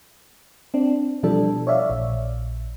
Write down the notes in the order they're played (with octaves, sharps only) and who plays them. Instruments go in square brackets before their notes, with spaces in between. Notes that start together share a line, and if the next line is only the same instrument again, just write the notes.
[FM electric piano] C4 D4
B2 E3 F3 G3 D4 A4
C#5 D5 E5 F5
A#1